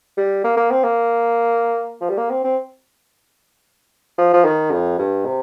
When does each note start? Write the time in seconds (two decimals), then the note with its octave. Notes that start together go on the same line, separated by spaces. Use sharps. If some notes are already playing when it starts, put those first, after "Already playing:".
0.17 G3
0.44 A#3
0.57 A#3
0.71 C4
0.83 A#3
2.01 F3
2.09 G3
2.17 A#3
2.31 C4
2.44 C4
4.18 F3
4.33 F3
4.45 D#3
4.71 F2
4.99 G2
5.25 C3